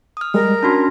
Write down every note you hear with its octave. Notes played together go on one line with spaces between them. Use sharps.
D#6 F6
G3 G#3 A#4
C#4 D4 F#4 A5 B5 C6